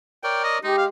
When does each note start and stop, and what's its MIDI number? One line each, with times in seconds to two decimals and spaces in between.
0.24 0.59 70
0.24 0.59 73
0.24 0.59 74
0.24 0.44 79
0.44 0.57 75
0.64 0.89 56
0.64 0.74 63
0.64 0.87 67
0.78 0.85 77